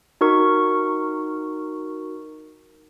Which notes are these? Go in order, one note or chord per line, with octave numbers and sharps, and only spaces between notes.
D#4 F#4 A#4 C#6